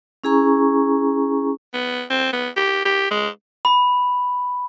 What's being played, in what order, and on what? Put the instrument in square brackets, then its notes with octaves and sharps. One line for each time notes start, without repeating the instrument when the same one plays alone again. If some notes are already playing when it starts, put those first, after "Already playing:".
[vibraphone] C#4 E4 G#4 G#5 A#5 C#6
[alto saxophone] B3
C4
B3
G4
G4
G#3
[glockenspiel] B5